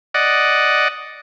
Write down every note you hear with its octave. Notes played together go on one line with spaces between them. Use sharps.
D5 D#5 F#5